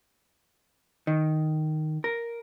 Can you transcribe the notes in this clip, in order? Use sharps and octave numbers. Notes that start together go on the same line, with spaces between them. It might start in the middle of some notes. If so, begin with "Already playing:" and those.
D#3
A#4